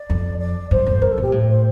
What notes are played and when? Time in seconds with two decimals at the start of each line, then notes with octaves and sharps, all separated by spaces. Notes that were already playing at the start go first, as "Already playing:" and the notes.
Already playing: D5
0.10 F2
0.39 D5
0.71 G2 C5
0.87 F2
1.02 G2 A#4
1.11 A4
1.18 A#2 G4
1.32 A2
1.48 C5